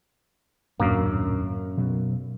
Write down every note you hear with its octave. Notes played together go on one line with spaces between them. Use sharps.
D#1 F#2 A2 A#3 D4
B2 F#3